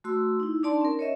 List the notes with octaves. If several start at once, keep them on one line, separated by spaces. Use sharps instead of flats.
A3 F#4 C6 E6
D#4 E4
D4 D#4 D5 A5 C6
C#4 A#4
C#5 D#5 E5